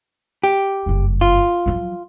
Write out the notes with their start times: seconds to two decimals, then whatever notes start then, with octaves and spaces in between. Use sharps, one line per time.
0.44 G4
0.86 F#1 G2
1.21 F4
1.66 F3 F#3